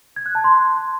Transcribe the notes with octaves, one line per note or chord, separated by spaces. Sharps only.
G#6
F#6
A5
C6